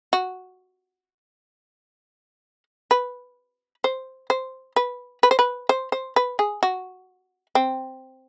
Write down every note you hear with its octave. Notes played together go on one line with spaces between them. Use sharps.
F#4
B4
C5
C5
B4
B4
C5
B4
C5
C5
B4
G#4
F#4
C4